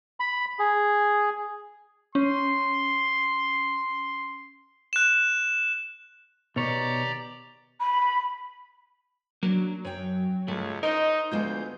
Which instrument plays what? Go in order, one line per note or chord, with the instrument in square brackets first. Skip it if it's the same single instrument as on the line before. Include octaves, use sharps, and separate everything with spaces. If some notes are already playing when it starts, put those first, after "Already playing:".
[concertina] B5
G#4
[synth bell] C#4 [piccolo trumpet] C6
[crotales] F#6 E7
[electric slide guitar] B2 D#3 C#5 [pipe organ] G4 D5 A#5
[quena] B5
[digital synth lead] F#3 [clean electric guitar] A#3 B3 D4
[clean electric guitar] F#2 [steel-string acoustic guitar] C#5 G5
[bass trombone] C#2 [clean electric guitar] G2 A3 [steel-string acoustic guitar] C#5
[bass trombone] D#4 [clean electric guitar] A#4 C5 [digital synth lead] D#5
[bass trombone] D2 [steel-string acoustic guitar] G#3 B3 F4 [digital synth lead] G6